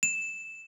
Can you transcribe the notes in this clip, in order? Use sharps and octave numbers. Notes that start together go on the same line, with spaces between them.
E7